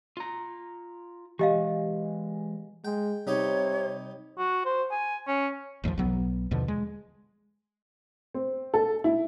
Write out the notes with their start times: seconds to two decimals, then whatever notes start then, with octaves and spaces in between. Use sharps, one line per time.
0.17 F4 A#5
1.39 E3 G#3 G4 D#5 F5
2.85 G#3 G5
3.27 C3 G3 D#4 G4 C#5
4.38 F#4
4.65 C5
4.91 G#5
5.27 C#4
5.84 A1 D#2 G#2 F3
5.98 B1 F#3 B3
6.51 D#2 B2 D3 F3
6.68 G#3
8.34 C4
8.74 A4
9.04 E4